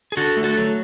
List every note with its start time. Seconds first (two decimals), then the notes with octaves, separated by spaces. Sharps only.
0.12 G#4
0.17 D3 F#4 A4
0.37 A3
0.44 F#4 A4
0.57 F#3